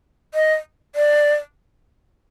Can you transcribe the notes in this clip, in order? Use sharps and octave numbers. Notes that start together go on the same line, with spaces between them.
D#5
D5